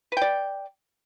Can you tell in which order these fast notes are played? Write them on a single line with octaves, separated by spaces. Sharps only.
B4 G5 D5